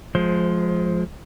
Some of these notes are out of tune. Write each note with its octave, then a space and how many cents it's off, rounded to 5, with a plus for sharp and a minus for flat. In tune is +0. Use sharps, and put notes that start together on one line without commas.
F3 +15 G#3 +30 C5 +0